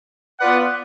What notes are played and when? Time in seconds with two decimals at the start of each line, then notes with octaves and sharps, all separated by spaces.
0.40 B3 F4 B4 D5 F#5